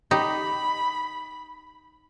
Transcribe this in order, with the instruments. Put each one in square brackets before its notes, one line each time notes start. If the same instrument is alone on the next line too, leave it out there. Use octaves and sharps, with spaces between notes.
[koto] D#4 G4 [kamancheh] B5